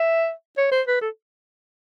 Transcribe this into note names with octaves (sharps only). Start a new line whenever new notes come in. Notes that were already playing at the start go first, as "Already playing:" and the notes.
Already playing: E5
C#5
C5
B4
A4